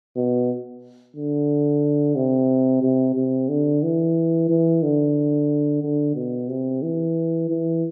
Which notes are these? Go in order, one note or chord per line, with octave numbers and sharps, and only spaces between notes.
B2
D3
C3
C3
C3
D3
E3
E3
D3
D3
B2
C3
E3
E3